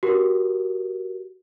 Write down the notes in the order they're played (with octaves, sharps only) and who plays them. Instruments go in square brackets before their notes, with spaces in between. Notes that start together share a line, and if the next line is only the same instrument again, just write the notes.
[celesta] F#4 G4 A#4